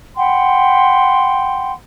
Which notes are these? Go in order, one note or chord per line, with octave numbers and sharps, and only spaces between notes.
F#5 G5 B5 C6